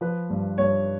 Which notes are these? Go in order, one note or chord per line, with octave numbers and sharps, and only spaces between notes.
F3 B4
G2
G2 C#5